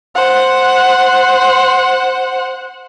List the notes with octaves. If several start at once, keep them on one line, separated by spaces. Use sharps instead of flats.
C5 F#5